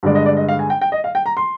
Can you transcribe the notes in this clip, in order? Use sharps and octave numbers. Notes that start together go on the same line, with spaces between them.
G2 D3 G#3 D5
D#5
D5
D#5
F5
G#5
G5
G5
D#5
F5
G5
A#5
C6